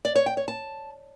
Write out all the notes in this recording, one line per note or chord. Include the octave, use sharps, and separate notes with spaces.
D5
C#5
G5
C#5
A5